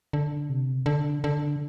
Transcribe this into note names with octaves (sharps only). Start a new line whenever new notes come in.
D3
C3
D3
D3